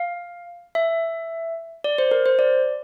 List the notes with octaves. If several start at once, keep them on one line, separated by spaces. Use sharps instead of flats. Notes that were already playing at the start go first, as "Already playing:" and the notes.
Already playing: F5
E5
D5
C5
A#4
C5
D5